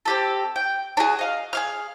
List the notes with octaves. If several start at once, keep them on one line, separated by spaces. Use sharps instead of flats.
C4 G4 A4
G5
D4 F#4 G#4
D#5 F5
G#4 F5 F6